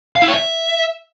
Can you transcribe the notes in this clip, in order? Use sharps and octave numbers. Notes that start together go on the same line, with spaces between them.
F5
E4
C#5
E5